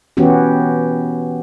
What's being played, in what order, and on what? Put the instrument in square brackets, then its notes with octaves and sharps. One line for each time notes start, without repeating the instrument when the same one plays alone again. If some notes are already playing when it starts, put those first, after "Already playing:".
[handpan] E3 B3 C#4 F#4 G4